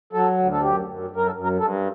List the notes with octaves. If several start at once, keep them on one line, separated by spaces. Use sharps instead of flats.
F#3 A4
D2
A4
F#2 G4
F#2
F#2
A#4
A4
F#2
A#4
G2 A4